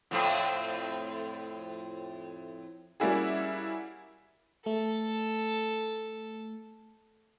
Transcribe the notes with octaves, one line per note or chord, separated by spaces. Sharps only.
F2 A2 C4
G3 A#3 C#4 E4 F#4 G#4
A3 A4